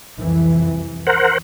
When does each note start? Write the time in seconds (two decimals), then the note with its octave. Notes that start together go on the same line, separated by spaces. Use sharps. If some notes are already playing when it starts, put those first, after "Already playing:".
0.17 C2 F2 E3
1.07 A#4 C5 F#5